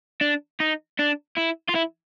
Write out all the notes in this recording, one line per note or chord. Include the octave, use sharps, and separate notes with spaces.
D4
D#4
D4
E4
F4
E4